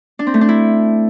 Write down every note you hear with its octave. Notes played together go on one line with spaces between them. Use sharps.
D4
C4
A3
D4
E4